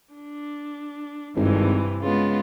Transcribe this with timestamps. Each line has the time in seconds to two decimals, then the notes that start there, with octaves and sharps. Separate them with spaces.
0.14 D4
1.36 G#1 G2 C3 E3
2.02 C#3 G#3 B3 F4